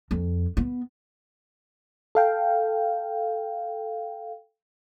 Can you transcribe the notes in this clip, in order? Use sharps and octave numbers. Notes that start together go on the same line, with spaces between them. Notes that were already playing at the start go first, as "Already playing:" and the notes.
F2
B3
A4 F5 G5